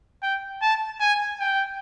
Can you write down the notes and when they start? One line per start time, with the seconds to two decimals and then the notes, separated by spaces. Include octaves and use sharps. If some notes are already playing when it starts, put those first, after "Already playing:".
0.23 G5
0.62 A5
1.01 G#5
1.40 G5